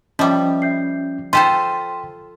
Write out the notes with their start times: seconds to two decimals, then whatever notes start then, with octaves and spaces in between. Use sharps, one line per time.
0.19 F3 G3 C#4 D#5 E5
0.62 E5 G6 C7
1.33 F4 A4 C5 G5 C6 B6 D#7